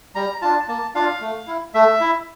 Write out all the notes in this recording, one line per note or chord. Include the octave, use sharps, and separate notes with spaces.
G3 A#5
D4 F4 A5
A#3 A5
D4 F4 F5
A3
E4
A3 E5
E4